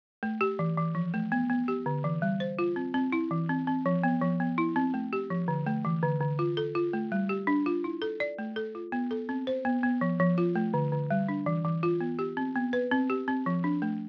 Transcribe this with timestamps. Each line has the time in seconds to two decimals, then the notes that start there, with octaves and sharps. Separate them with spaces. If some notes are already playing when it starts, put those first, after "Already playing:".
0.23 A3
0.41 G4
0.59 E3
0.77 E3
0.95 F3
1.14 A3
1.32 B3
1.50 B3
1.68 G4
1.86 D3
2.04 E3
2.22 G3
2.40 C5
2.59 F4
2.76 C4
2.94 C4
3.12 E4
3.31 E3
3.49 C4
3.67 C4
3.86 F3
4.04 B3
4.22 F3
4.40 B3
4.58 E4
4.76 C4
4.94 A3
5.13 G4
5.30 F3
5.48 D3
5.66 A3
5.85 E3
6.03 D3
6.21 D3
6.39 F4
6.57 A4
6.75 F4
6.93 A3
7.12 G3
7.29 G4
7.47 D4
7.66 F4
7.84 E4
8.02 A4
8.20 D5
8.38 A3
8.56 A4
8.75 F4
8.92 B3
9.11 A4
9.29 C4
9.47 C5
9.65 B3
9.83 B3
10.01 F3
10.20 F3
10.38 F4
10.56 A3
10.74 D3
10.92 D3
11.11 G3
11.29 D4
11.46 E3
11.65 E3
11.83 F4
12.01 B3
12.19 G4
12.37 C4
12.55 B3
12.73 B4
12.91 C4
13.10 G4
13.28 C4
13.46 F3
13.64 D4
13.82 A3